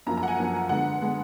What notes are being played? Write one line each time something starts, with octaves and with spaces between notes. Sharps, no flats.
F#2 F3 A#3 A#5
A#5
F#5
G#5
F#2 F3 A#3
D3 G#3 B3 F#5
D3 G#3 B3